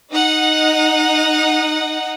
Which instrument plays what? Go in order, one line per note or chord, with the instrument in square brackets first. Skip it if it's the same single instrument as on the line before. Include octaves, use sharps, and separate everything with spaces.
[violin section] D#4 D#5 F#5